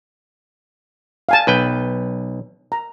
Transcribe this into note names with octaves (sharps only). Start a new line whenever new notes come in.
F5 G#5 A5
B1 B4 G5
A#5